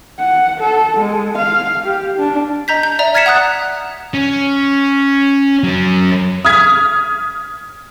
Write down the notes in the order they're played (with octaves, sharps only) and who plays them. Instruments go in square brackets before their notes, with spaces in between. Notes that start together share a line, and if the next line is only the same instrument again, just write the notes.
[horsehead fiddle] F#5
A4
G#3
F5
G4
D4
[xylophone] D#5 A#5 G6 B6
G6
D5 E5 A#5
F6 G#6 A6 B6 C#7 E7
F#5 A#5 D#6 F#6
[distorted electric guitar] C#4
F#3 C#4
[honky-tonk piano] D#6 F6 G#6 B6